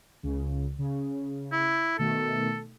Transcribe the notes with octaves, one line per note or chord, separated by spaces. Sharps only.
C#2 C#3
C#3
E4
B2 D#3 A3 A4